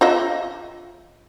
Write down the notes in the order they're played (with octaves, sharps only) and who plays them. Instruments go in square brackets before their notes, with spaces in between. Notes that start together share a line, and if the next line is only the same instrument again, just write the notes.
[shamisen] F4 D#5 E5